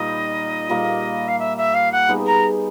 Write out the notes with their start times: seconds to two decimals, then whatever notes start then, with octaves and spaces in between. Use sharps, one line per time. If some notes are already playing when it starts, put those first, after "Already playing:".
Already playing: A#2 G3 D#4 D#5
0.69 A#2 G3 A#3
1.28 F5
1.39 E5
1.57 E5
1.74 F5
1.92 F#5
2.09 G3 B3 D#4 G#4
2.26 A#5